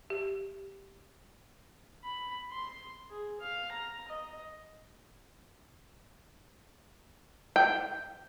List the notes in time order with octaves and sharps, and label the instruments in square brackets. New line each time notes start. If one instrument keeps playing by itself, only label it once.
[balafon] G4
[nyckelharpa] B5
C6
G#4
F5
A#5
D#5
[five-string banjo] G5